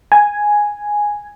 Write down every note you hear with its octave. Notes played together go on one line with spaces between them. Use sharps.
G#5